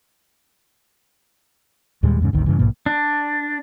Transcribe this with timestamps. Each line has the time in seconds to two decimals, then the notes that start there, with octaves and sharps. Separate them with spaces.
2.03 D#2 A#2 G3 G#3
2.20 E2 G#2 C#3
2.33 G#1 D2 D#3
2.46 G2 C#3 E3
2.58 A#1 G#2 B2 A#3
2.86 D4